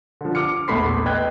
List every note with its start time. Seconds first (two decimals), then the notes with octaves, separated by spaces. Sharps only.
0.21 D3 F3
0.35 D6 F6 C#7
0.68 A#1 E2 A3 B5 C6 C7
1.06 B4 D#5 G5 F#6 G#6